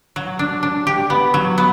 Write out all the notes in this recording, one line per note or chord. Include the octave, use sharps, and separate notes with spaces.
F#3
D4
D4
G4
B3
F#3
B3